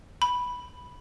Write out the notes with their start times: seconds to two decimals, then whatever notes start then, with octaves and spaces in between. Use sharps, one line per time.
0.22 B5